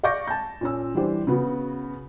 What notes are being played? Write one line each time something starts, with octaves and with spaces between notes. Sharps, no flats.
D5 F5 C#6 D6 G6 A#6
A5 G6
A#2 C#4 E6
E3 G3 D4 E4 G4 C5
C#3 B3 F#4